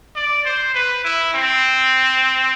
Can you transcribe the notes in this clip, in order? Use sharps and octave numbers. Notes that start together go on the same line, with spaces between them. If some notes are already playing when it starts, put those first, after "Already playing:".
D5
C5
B4
E4
C4